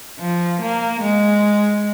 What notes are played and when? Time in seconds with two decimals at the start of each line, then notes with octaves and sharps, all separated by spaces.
0.20 F3
0.61 A#3
1.02 G#3